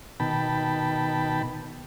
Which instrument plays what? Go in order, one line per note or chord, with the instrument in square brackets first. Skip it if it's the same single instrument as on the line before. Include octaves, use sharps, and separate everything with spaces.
[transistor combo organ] B2 D#3 G5 A5 B5